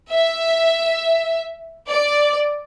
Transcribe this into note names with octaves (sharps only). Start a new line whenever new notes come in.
E5
D5